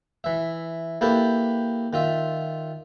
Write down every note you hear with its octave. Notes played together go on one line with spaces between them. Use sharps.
E3 E5
A#3 E4 G4 A4 B4 A5
D#3 F4 E5